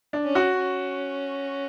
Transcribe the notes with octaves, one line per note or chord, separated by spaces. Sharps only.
D4
C#4
F#4
C#4